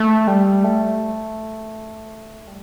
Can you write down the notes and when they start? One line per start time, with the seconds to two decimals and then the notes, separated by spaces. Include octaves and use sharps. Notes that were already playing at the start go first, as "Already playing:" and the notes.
Already playing: A3
0.28 G3
0.64 A3
2.47 G3